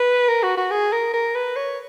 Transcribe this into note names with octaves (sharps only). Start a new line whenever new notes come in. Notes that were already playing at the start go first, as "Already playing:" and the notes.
Already playing: B4
A#4
F#4
F#4
G#4
A#4
A#4
B4
C#5